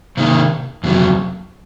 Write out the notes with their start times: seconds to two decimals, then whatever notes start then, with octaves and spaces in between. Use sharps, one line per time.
0.17 C3 D#3 A#3 D#4
0.84 F2 C3 F#3